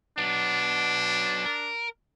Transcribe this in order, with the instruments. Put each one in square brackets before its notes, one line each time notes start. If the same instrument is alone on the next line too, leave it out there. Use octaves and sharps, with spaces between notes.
[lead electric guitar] F#3 B3 [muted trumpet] D4
[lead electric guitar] A#4